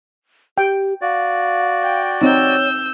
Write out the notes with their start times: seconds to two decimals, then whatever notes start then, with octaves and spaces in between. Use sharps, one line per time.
0.58 G4 G5
1.02 F#4 D5 F5
1.82 G5
2.22 C4 D#4 C#5 E6 G6